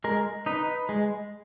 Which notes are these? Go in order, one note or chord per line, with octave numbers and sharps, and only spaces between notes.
G#3 A#4
D#4 B4
G#3